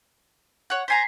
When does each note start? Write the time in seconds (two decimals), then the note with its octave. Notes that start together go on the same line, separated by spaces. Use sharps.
0.70 C#5 F#5
0.88 C5 G#5 A#5 B6 C7